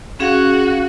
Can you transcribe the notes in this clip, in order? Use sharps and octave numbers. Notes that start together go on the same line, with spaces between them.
C#4 F#4 G#4 F5